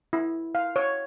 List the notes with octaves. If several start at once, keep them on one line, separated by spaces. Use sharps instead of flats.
E4
F5
C#5